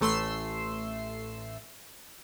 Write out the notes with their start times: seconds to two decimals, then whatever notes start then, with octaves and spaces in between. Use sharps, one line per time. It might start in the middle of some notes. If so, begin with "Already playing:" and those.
0.01 A1 A3 C6 E6 C7